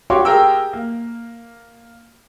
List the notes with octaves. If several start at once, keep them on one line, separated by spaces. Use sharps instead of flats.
F#4 G4 C#5 F5 C6 D6
G4 G#4 A#4 G5 E6
A#3